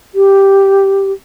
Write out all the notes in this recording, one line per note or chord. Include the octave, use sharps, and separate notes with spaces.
G4